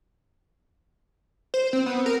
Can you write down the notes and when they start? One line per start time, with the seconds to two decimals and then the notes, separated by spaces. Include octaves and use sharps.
1.54 C5
1.73 C4
1.86 B3
2.06 A#4